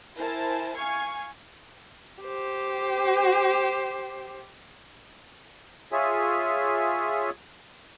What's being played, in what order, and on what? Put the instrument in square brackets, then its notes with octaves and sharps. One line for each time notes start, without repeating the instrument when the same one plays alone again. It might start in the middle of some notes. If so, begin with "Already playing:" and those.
[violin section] E4 A#4 C5 G#5 A5
F5 G#5 C#6 G#6
[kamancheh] G4 C5
[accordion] F4 G#4 C#5 E5 G#5